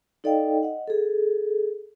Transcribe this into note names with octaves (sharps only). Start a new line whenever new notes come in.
D#4 A4 D5 D#5 F5 G5
D#5 F#5
G#4 A4